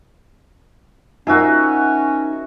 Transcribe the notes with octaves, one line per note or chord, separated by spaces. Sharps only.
C#4 D#4 F4 F#4 A#4 C5 E5 G#5